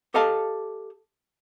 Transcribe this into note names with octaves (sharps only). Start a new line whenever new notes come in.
G4 A4 D#5 F5 A5